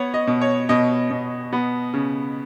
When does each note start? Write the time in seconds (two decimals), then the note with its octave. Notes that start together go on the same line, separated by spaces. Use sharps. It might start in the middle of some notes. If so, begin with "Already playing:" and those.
Already playing: B3 C#5
0.14 D#5
0.27 B2
0.41 C#5
0.69 B2 D#5
1.11 B2
1.53 B3
1.94 C#3